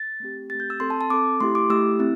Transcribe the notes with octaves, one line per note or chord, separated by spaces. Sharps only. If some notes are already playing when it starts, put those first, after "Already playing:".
Already playing: A6
A3 C4 G4
A3 C4 G4 A6
G6
E6
C4 A4 C6
A5
A5
C4 A4 D6
A3 E4 G4 C6
D6
A3 E4 G4 E6
C4 E4